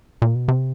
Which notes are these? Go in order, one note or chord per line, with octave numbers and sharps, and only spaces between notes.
A#2
B2
C3